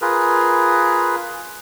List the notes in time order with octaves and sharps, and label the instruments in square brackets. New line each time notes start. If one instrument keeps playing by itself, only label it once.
[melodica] F4 G#4 A#4 B4